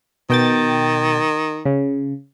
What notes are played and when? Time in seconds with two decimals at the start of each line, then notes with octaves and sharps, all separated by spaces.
0.30 B2 D#3 G5 A6
1.65 C#3